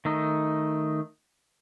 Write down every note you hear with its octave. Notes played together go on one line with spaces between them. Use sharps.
D#3 A3 D#4